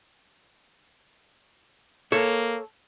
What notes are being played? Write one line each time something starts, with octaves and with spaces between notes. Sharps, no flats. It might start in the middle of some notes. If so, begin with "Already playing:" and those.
A#3 A4 C#5